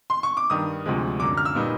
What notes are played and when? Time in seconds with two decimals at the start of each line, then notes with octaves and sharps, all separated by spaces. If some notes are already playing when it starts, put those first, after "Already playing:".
0.10 C6
0.23 C#6
0.37 D6
0.50 G2 D#3 G3 D#6
0.86 D2 C3 F3 G#3
1.19 F#2 D3 F#3 D6
1.37 F6
1.45 E6
1.55 A#2 G3 B3 D#4